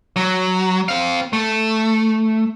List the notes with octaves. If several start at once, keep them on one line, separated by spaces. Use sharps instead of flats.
F#3
C4 F5
A3